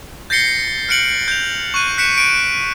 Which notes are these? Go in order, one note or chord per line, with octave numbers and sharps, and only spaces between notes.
G6 A6 A#6 C7 C#7 G7
F6 F#6 C#7 D7 F#7
G6 F7
C#6 F#6 D#7
F#6 B6 C#7 D7 E7
D7 D#7